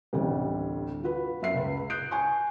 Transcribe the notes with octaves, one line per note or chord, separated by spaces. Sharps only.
A1 D2 C3 G3
F4 F#4 B4
F#2 E5 C7
C#2 B4
D#6 F#6 G6 C7 D7
G#5 C#6 G6